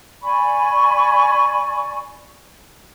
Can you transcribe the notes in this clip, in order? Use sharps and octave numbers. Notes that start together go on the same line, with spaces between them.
D5 G#5 B5 C#6